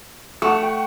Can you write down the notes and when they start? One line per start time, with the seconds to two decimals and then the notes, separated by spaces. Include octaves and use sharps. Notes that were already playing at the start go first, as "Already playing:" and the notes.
0.42 A3 F#5 C#6
0.63 G5